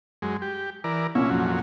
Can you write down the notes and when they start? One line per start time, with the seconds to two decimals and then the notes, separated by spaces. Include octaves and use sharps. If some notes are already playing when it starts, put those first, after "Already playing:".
0.22 F#2 G#3
0.42 G4
0.84 E3 A#4 D5
1.15 C2 F#2 A#2 C#4 E4
1.30 F2 F#3